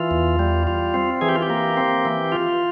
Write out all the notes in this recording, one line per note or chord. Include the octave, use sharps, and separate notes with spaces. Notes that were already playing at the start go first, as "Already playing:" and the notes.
Already playing: E3 F4
E2
G3
F4
C4
E3 G#4
G4
F4
G4
A#3
C4
E3
F4